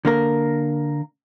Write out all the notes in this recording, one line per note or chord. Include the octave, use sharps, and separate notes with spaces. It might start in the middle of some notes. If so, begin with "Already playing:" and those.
D3 A#3 A#4